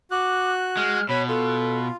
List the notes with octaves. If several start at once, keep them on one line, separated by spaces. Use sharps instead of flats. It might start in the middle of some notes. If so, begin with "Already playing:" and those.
F#4 D6 F#6
G#3 F6
B2 C#5 B5
F4 A4